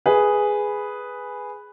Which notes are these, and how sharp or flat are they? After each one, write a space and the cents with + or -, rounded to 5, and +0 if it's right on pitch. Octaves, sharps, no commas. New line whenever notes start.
G#4 +0 B4 +0